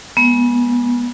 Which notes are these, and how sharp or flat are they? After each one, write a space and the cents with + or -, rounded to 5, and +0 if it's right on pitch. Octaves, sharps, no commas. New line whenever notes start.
G#3 +0 B3 -25